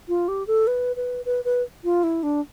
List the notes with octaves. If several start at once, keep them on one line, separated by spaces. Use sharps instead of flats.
F4
G4
A4
B4
B4
B4
B4
F4
E4
D4